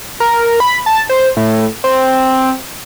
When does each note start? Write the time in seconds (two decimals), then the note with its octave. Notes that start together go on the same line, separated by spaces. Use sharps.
0.20 A#4
0.60 B5
0.86 A5
1.09 C5
1.37 A2
1.84 C4